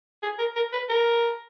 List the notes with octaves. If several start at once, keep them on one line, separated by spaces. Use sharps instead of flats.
G#4
A#4
A#4
B4
A#4